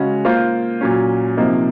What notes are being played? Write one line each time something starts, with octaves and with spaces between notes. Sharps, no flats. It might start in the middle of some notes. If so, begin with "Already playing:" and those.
Already playing: C#3 G#3 C#4 F#4
A#3 F4 C5
A#2 F#3 C#4
C3 F3 A#3 D#4